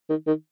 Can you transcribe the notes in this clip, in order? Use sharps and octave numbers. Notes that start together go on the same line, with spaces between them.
D#3
D#3